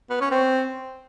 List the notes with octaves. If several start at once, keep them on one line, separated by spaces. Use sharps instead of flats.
B3
C#4
C4